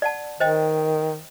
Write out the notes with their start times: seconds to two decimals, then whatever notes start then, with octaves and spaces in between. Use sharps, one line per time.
0.02 D5 F#5 A5
0.40 D#3 C5 D#5 G5